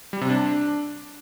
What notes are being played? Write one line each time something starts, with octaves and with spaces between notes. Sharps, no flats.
G3
C3
D4